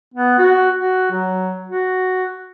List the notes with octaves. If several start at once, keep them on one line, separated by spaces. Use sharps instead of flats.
B3
F#4
F#4
F#3
F#4